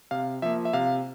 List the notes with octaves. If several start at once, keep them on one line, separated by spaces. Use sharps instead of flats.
C3 F5
F3 A#3 E5
E5
C3 F5